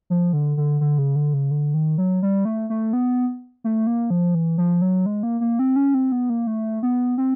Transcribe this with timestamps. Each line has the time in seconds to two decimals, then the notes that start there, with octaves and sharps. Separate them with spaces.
0.10 F3
0.33 D3
0.57 D3
0.81 D3
0.98 C#3
1.16 D3
1.34 C#3
1.51 D3
1.74 D#3
1.98 F#3
2.23 G3
2.45 A3
2.70 A3
2.93 B3
3.64 A3
3.87 A#3
4.10 F3
4.35 E3
4.58 F3
4.82 F#3
5.06 G#3
5.23 A#3
5.41 A#3
5.59 C4
5.76 C#4
5.94 C4
6.12 B3
6.30 A#3
6.47 A3
6.83 B3
7.18 C4